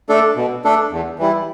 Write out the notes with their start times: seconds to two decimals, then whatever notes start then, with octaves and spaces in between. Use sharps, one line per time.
0.09 A3 D4 A4
0.36 B2
0.64 A3 D4 A4
0.92 E2
1.19 E3 G3 E4